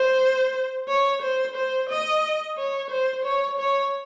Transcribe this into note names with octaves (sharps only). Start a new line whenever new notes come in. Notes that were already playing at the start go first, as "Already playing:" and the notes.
Already playing: C5
C#5
C5
C5
D#5
C#5
C5
C#5
C#5